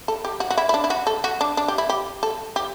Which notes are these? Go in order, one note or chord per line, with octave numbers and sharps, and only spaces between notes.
A4
G4
F#4
F#4
E4
E4
D4
E4
F#4
A4
F#4
D4
D4
G4
E4
G4
A4
G4